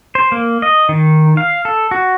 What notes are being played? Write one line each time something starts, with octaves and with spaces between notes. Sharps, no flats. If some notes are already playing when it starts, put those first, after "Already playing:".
C5
A#3
D#5
D#3
F5
A4
F#4